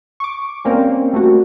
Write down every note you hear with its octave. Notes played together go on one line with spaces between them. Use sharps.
C#6 D6
G3 A#3 C4 C#4
G3 A3 A#3 F#4